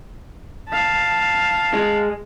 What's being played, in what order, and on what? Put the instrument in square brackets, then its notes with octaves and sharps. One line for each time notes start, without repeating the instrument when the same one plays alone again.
[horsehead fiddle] F5 A5
[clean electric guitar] G#3